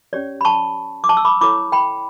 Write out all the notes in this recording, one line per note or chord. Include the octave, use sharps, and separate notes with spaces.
C#4 G4 C#5 D5
B5
A5 C#6
D6
A5 C#6
E6
B5 D6
E4 A4 C#5 B5 D6
G5 B5